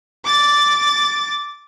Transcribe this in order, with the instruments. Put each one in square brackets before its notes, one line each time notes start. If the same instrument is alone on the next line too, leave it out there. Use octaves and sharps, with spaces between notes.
[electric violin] D6 A6